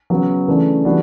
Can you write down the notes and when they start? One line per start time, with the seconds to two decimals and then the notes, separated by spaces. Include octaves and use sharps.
0.10 C#3 F#3 B3
0.48 C#3 E3 A3 D4
0.85 E3 G3 B3 D4 F#4